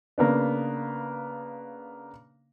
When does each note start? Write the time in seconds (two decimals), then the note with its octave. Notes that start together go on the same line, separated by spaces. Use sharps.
0.18 C#3 A#3 B3 D4